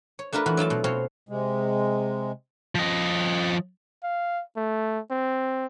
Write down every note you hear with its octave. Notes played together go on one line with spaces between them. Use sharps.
C#5
A3 D4 F4 A#4 B4
E3 F4 F#4
F#3 E4 F4 A5
B2
B2 C4 C#5 F5 C6
C3 G#3
F3 D#5
F5
A3
C4